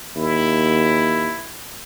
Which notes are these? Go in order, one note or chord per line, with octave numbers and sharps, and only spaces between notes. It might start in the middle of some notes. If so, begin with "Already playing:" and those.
D#2 E4